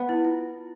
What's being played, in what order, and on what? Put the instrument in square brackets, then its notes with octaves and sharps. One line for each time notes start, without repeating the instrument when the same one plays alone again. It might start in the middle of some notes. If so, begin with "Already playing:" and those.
Already playing: [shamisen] B3
[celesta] E4
F4